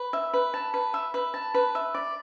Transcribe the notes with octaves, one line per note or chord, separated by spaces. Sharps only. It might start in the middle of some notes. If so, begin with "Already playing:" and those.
Already playing: B4
E5
B4
A5
B4
E5
B4
A5
B4
E5
D5